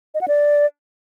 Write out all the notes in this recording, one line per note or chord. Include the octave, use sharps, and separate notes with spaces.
D#5
F#5
D5